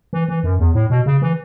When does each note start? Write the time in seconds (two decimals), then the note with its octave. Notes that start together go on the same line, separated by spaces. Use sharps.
0.13 E3
0.28 E3
0.43 F#2
0.59 E2
0.74 A2
0.90 B2
1.06 C#3
1.22 E3